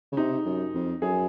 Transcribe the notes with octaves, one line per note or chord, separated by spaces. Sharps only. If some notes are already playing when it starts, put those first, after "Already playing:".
C#3
C3 D#4
F#2
F2
F#2 G#4